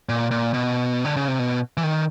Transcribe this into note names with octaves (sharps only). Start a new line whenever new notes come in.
A#2
A#2
B2
D3
C#3
C3
B2
E3
D#3